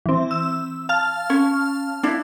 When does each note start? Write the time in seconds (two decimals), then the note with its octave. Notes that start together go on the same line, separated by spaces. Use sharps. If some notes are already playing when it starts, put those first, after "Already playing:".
0.06 E3 C4
0.31 E6
0.89 F5 A5 F6
1.30 C#4 C#5
2.03 D4 E4